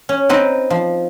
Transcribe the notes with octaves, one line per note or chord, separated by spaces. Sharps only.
C#4
C4 D#4 B4
F3